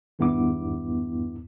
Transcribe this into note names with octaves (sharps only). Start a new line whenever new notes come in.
G#1 E2 G2 B3 E4 D6